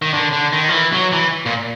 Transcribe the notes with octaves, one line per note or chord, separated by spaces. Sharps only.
D#3
D3
D3
D#3
F3
E3
F#3
E3
A#2